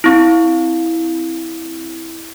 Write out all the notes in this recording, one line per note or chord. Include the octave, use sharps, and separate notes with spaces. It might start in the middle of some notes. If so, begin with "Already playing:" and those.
C4 E4